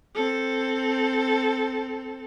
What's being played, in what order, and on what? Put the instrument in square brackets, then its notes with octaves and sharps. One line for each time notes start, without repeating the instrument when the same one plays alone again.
[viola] C4 A4